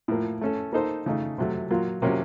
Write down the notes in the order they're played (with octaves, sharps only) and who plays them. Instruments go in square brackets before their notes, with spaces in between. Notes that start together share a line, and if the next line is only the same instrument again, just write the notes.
[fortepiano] A2 F3 A#3
A3 C#4 A4
A#3 D#4 A4 C5
C#3 A3 D#4
C3 F#3 A3
A#2 F#3 A#3 F4
C3 F#3 A#3 C#4